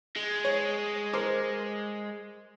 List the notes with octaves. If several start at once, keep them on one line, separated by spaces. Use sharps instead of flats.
G#3
C#5
A#4 C5 D6